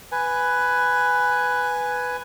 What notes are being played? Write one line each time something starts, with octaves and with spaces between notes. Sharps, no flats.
B4 G#5